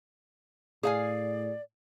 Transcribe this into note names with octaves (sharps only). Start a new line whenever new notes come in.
A2 G#4 D5 F5 G#5